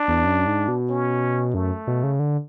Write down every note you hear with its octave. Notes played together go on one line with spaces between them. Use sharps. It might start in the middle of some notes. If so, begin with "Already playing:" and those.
Already playing: D4
E2
F#2
G#2
B2
C#4
F#2 A3
B2
C#3
D3